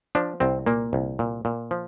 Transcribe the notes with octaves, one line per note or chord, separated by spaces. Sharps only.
F3 D4
C2 C4
A#2 A#3
C2
A#2
A#2
F3